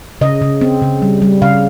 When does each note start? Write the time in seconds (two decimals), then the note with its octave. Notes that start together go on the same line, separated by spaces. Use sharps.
0.21 C#3 D#5
0.42 C#3
0.61 C4
0.82 C#3
1.02 G3
1.22 G3
1.42 C#3 F5